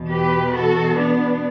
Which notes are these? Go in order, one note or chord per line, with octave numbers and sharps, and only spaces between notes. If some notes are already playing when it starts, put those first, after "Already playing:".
Already playing: E2 B2
G4 B4
F#4 A4
B3 D4